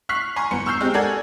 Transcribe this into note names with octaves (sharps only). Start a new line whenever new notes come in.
C#6 F6 F#6 B6 C7
G#5 A#5 C6 C#6
G1 B3 C#7
C#6 E6 F6 G6 C7
G#3 C4 G4
A4 A#4 D5 F#5 G#5 G#6